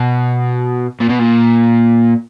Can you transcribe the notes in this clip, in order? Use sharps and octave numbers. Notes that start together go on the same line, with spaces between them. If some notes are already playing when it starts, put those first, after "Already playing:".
Already playing: B2
A#2
B2
A#2